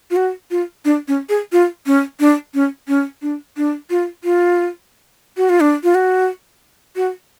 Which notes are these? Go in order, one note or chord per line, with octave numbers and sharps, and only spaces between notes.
F4
F#4
F4
D4
C#4
G#4
F4
C#4
D4
C#4
C#4
D4
D4
F4
F4
F#4
F4
D4
F4
F#4
F#4